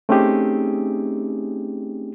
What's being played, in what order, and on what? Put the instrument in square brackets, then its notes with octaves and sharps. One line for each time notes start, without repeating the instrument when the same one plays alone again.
[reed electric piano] A3 C4 C#4 D#4 G4 G#4